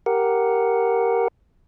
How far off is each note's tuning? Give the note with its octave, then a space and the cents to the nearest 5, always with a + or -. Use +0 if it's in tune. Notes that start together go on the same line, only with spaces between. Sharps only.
G4 +0 A#4 +0 F#5 +0